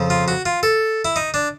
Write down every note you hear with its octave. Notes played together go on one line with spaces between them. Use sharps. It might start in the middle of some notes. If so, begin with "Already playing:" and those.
Already playing: F2 C#3 F3
F4
F#4
F4
A4
E4
D#4
D4